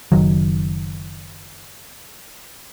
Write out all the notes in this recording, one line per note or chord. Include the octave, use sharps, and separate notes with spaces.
F#1 D#3 F#3